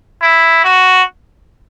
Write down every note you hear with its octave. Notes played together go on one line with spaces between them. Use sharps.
E4
F#4